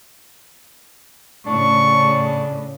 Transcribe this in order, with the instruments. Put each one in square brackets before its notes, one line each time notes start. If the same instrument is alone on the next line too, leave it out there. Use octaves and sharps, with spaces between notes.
[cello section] A2 C#3 [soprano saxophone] D4 [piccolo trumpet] C#6